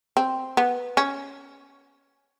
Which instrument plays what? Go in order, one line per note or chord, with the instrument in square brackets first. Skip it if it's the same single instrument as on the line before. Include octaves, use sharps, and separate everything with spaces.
[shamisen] C4
B3
C#4